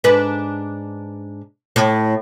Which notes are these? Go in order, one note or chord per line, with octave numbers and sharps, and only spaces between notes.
G#2 D4 B4
A2